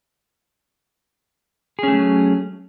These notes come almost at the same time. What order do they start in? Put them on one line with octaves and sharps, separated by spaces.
G#4 C#4 A3 F#3